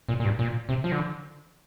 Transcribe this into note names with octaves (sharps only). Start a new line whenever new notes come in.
A#2
A#2
G2
A#2
C3
F3
D3